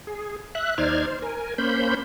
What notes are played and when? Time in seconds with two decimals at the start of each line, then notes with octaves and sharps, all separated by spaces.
0.07 G#4
0.55 E5 F#6
0.78 D#2 D#4 C5 D5 F6 G#6
1.07 C5
1.22 A#4 G#5
1.58 A#3 C#4 C5 B5 G6